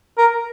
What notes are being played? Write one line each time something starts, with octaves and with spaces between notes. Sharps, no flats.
A#4